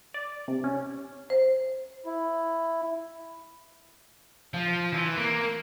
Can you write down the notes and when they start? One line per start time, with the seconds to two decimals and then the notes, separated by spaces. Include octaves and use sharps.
0.14 D5
0.48 C3
0.64 C#4
1.30 C5
2.06 E4
4.54 F3
4.93 E3
5.17 A#3